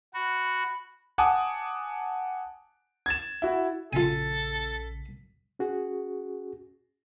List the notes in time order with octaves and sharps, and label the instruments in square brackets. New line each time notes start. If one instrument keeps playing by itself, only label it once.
[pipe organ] F#4 [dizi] B5
[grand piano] F#5 G#5 A5 D6 D#6
G#6 A6 E7
E4 F#4
[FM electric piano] A#1 C#3 B6 [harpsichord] F4 G#5 [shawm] A4
[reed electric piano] C#4 F#4 G#4